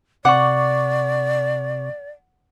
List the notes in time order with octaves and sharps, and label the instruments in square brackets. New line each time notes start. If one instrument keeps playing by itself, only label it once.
[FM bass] C3 [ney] D5 [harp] F#5 [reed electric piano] C#6 D6